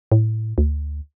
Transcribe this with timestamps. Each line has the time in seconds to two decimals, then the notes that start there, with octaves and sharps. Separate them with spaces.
0.12 A2
0.58 D2